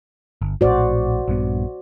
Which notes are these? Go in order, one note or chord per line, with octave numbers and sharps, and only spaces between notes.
G1
A#1 A2 F#4 C5 D5
A#1 G2 B3